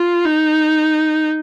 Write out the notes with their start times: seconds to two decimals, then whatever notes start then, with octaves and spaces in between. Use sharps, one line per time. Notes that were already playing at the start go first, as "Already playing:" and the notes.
Already playing: F4
0.25 D#4